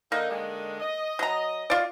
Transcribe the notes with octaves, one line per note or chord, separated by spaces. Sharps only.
D3 A#3 D#4
D3 D#3 G#3
D#5
F#3 A#5
F4 D5